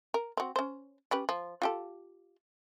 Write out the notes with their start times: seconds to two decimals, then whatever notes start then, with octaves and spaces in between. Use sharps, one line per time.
0.14 A#4
0.37 C4 F#4
0.56 C#4 C5
1.11 C#4 G4 B4
1.29 F3
1.62 F4 G4 A4